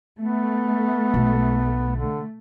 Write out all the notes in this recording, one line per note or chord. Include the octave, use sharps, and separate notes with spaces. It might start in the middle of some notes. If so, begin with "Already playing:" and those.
A3 B3
B1
D3